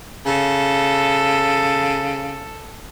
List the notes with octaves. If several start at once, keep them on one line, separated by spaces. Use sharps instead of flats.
C#3 A4